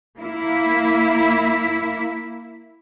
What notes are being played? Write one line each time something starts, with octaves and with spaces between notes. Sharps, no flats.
A#3 E4